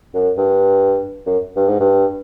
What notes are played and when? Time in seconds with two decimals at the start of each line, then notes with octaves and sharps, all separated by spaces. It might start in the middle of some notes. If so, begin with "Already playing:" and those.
0.14 F#2
0.37 G2
1.26 F#2
1.56 G2
1.69 G#2
1.80 G2